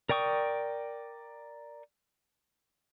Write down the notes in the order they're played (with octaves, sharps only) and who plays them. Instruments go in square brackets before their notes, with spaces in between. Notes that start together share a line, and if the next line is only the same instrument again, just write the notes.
[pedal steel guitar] A#4 D5 G5 C#6 D#6